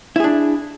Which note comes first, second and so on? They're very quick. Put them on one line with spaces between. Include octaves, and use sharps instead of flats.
E4 G#4 D4